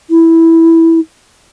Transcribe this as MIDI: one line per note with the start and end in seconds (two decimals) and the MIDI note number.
0.10 1.00 64